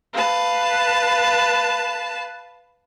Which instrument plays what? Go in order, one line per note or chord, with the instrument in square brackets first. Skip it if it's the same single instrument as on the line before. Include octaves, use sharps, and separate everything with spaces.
[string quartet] B4 F5 A5